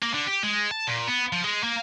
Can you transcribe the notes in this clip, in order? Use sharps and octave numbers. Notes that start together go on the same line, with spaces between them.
A#3
D3
G4
G#3
A5
A#2
B3
F3
G#3
A#3